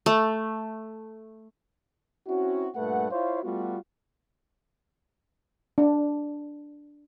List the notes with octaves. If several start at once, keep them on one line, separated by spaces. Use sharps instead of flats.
A3
C4 C#4 E4 F#4
G2 A#2 A3 B4 F#5
E4 F4 C5 C#5 F5
G3 A3 B3 F4 F#4
D4